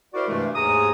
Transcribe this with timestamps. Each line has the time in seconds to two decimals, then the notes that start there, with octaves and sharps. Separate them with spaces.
0.14 E4 F#4 A#4 C5 D5
0.28 G2 C3 E3 G#3 A3
0.56 D#2 G#2 G#4 G#5 A#5 D#6